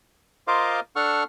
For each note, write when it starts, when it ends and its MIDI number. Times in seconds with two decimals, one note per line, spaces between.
0.47 0.80 65
0.47 0.80 70
0.47 0.80 72
0.47 0.80 75
0.47 0.80 77
0.47 0.80 86
0.96 1.24 62
0.96 1.24 69
0.96 1.24 78
0.96 1.24 85
0.96 1.24 89